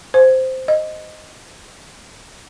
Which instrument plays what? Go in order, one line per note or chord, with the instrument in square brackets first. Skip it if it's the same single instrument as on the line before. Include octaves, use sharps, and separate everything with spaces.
[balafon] C5
D#5